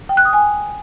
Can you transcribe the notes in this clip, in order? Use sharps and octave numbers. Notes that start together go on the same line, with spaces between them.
G5
F#6
D#6
G#5